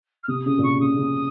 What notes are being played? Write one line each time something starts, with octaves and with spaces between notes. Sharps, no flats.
F6
C3 D#6
C#3 D#6
A#2
C3 C#6
C#3 D#6
C#3